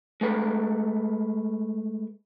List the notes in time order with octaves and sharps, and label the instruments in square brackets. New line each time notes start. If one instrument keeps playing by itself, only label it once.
[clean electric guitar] G#3 A3 B4